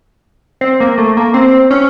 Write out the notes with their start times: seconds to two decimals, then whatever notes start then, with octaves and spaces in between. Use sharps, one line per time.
0.61 C4
0.80 A#3
0.98 A3
1.17 A#3
1.34 C4
1.71 C#4